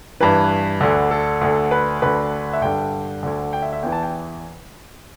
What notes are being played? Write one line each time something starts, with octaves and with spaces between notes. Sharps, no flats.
G2 E3 B4
D2 D3
A4
D2 D3
B4
D2 D3 B4
E5
G2 D3 G5
D2 D3
G5
E5
E5
E2 E3 G5
A5
G5